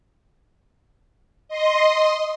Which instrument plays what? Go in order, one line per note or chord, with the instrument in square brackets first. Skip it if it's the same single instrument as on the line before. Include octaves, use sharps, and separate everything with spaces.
[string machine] D#5 C6